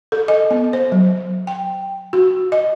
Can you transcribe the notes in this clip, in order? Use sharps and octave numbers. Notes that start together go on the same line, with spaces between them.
A4
D#5
B3
C5
F#3
G5
F#4
D#5